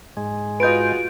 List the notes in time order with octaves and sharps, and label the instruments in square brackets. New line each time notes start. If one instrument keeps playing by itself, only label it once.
[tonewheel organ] G#2 G#3
[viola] F4 F#4 [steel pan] B4 D#5 [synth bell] G6 D7